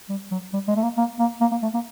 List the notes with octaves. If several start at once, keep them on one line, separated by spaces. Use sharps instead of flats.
G3
F#3
G3
G#3
A3
A#3
A#3
A#3
A#3
A#3
A3
A#3